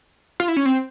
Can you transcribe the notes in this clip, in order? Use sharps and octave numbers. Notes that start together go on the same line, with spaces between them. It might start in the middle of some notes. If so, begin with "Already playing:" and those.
F4
E4
C#4
C4